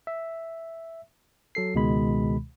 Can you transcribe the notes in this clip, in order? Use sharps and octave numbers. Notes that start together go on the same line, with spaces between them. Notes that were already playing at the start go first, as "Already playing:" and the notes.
E5
F#3 A4 C7
C#2 B2 D#3 G#3 B5